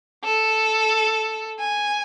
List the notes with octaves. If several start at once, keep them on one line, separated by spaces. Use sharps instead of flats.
A4
G#5